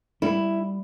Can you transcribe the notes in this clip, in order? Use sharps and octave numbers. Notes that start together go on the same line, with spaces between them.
G3 E4